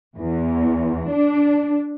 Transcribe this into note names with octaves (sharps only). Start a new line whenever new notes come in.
E2
D4